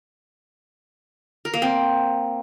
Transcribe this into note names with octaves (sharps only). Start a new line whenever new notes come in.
A#4
A#3
C4